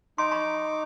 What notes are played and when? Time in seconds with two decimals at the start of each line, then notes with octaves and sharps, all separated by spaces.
0.18 D#4 C6 D6
0.31 A#5 B5 C#6